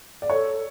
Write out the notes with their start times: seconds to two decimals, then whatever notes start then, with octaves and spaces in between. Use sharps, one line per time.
0.22 D5
0.30 A4 C#5